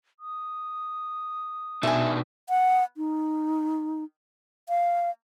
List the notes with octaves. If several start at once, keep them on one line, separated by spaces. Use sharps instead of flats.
D#6
B2 D4 D#4 B4 E5 G#5
F#5
D#4
F5